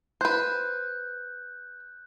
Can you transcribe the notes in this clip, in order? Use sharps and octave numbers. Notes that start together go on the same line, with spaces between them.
B4 C5 F#6 G6